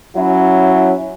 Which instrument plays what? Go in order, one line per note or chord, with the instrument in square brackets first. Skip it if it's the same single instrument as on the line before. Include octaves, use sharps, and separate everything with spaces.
[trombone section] F#3 C#4 E4